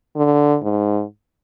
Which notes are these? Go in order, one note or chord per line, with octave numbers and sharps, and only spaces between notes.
D3
G#2